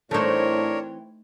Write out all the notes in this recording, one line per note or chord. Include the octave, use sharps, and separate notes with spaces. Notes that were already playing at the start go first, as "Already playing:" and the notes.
A2 E3 A3 C4 D4 D#4 A#4 C#5